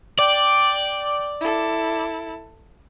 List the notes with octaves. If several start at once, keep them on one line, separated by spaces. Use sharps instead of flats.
D5 G5
E4 A4